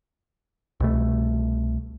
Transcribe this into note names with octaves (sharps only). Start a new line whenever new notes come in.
C2 B2 A3